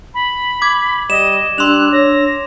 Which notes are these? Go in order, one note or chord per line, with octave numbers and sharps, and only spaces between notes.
B5
D6 G#6
G3 D#5 E7
G3 D4 C6 E6 F#6 F7
C#5 A#6